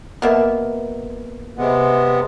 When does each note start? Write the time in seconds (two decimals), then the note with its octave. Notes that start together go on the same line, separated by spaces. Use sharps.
0.22 B2 A#3 E5
1.58 C3 G#3 B3